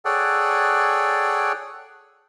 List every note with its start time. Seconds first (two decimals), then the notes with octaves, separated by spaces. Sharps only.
0.05 G#4 A4 C#5 D5 F#5 G5